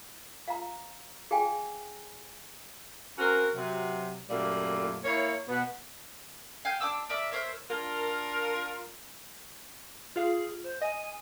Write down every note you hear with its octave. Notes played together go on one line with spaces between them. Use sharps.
F5 A#5
G#4 F5 G5 G#5
C4 C#4 F#4 A#4
C3 F#3
F#2 A#2 G3 A3 A#3
A#3 E4 C#5
B2 B3
F5 G5 G#5 G6
D4 D6 E6
A#4 D5 E5 D6
A#4 C5 C#5 E5
D4 F4 A#4
F4 G#4 F5
C5
D#5 G#5